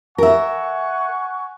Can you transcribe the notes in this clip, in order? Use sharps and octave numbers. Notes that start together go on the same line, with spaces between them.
A#4 E5 F#5 G#5 C#6